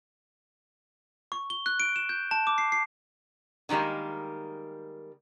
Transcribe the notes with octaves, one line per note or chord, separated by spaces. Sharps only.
C#6
G7
F#6
D7
E7
G6
A5
D6
C7
C7
D3 D#3 G3 G#3 A#3